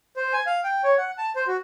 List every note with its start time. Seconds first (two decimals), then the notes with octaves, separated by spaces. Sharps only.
0.16 C5
0.33 G#5
0.47 F5
0.64 G5
0.84 C#5
0.98 F#5
1.18 A5
1.36 C5
1.47 F#4